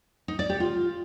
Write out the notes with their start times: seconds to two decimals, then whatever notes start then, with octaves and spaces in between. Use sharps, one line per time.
0.28 D#4
0.39 D5
0.50 G4
0.60 F4